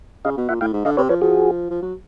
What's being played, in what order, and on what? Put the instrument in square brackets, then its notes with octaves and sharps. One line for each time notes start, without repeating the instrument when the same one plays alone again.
[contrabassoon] C#3 [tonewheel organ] D#5 F5
[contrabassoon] B2
[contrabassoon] A#2 [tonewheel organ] E5 F#5
[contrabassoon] A2 [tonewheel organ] F5 G5
[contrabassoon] G#2
[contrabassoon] D3 [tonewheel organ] D#5 F5
[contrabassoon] C3 [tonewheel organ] B4 C#5
[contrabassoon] F3 [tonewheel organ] B4 C#5
[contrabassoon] F3 [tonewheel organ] F#4 G#4
[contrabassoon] F3
F#3